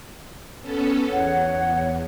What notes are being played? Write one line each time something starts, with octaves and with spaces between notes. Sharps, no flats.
B3 C#4 A4
E2 C#5 F#5